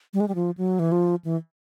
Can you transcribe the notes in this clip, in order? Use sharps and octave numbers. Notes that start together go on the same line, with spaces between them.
G3
G#3
G3
F3
F#3
E3
F3
E3